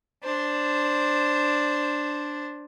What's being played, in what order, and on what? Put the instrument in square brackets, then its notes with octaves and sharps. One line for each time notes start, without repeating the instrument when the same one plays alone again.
[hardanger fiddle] D4 C5